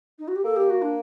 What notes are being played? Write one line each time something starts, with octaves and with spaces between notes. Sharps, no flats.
D#4
F#4
G4
A#3 A4
G4
F#4
D4